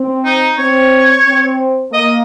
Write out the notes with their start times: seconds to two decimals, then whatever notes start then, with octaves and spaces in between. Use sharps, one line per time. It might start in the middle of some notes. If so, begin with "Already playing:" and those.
Already playing: C4
0.25 D#4
0.59 C4 C#5
1.27 C4
1.93 A#3 D#5